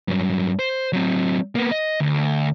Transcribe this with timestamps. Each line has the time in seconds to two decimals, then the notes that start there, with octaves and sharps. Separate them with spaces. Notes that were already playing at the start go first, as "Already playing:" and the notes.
0.08 G2 F#3
0.59 C5
0.93 F#3 C4
1.55 A#3 B3
1.71 D#5
2.00 D2